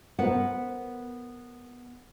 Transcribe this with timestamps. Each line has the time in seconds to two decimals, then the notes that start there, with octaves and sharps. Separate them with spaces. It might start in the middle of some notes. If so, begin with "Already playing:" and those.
0.19 B3 A#4 C5 F#5